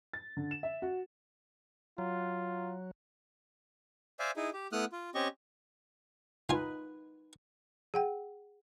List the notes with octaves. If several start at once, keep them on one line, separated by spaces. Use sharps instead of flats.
A6
D3
E7
E5
F#4
F#3 F4
C5 D5 E5 F5 G#5
D#4 E4 G#4
G4
A3 B3 E4 D#6 F6 F#6
F4
C4 C#4 G4 D#5 C#6
D#4 F4 B4 G#5
G#4 F#5 G5